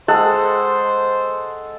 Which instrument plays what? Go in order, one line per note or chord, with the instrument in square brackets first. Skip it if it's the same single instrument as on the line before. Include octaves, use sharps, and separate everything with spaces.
[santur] G#3 A4 F#5 [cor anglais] C5